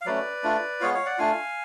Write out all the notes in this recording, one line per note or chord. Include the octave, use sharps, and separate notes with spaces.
F5
F#3 A3 C#4 B4 D5
A3 D4 F4
G#3 B3 F4 C#5 F5
C#5 F5
D5 F#5
A3 D4 F4 F5 G#5